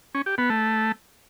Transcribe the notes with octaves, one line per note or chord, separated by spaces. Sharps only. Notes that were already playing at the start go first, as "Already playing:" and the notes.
C#4
G4
B3
A3